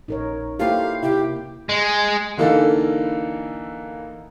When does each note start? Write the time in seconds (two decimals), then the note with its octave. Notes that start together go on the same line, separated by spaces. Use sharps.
0.08 A#1 D#4 A#4 C#5
0.59 A#3 E4 F4 G4 A4 C5 F5
1.03 C3 E4 G4
1.69 G#3
2.37 D3 E3 A#3 D#4 A4